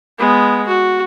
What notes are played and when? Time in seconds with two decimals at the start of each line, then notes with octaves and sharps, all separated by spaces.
0.19 G#3 B3
0.67 F#4